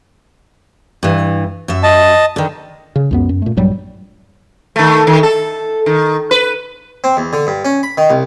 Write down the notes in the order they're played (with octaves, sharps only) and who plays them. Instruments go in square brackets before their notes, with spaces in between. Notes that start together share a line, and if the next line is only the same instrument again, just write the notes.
[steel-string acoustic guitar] G2 E3
F#2 E5
[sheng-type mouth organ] D#5 A5
[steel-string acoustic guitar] D3 D#3
[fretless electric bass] C#3
C#2 F#2 B3
F#2
A#2 A3
A#1 G2 F#3 G3
[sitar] D#3 A3
D#3
A4
D#3
B4
[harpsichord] C4
E2
D3
G2
C#4
B5
D#3
C2